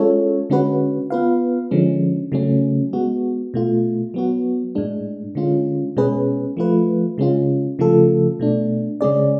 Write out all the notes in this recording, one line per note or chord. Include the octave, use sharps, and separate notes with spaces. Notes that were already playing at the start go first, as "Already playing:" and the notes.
Already playing: G#3 C#4 F4 A4 C#5
D3 G#3 C#4 F#4 B4
B3 F4 B4 F5
D3 F3 G#3 C#4
C#3 F#3 A3 C#4
G#3 B3 F#4
B2 A3 F4
F#3 B3 F#4
A2 G#3 D4
D3 G#3 C#4 F4
B2 G#3 C#4 G#4 B4
F3 A3 F4 B4
C#3 G#3 C#4 F4
C#3 F3 A3 F4 A4
B2 A3 D4
C#3 G#3 C#4 G#4 D5